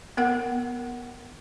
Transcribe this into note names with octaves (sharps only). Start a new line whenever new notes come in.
B3 A#4 F#5